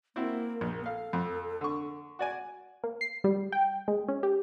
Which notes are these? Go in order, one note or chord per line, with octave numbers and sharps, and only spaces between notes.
A#3 C4 E4 F#4
A#1
A4 F5
F2
D3 C#6
F#4 D5 G#5
A#3
C7
G3
G5
G#3
C#4
G4